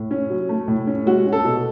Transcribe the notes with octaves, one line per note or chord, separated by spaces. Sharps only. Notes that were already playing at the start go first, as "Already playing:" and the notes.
Already playing: A2
C#4
F#3
A3
A2
C#4
G#3 F#4
C#4
A4
B2